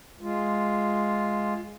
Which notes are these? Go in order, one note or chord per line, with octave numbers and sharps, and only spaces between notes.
G#3 F4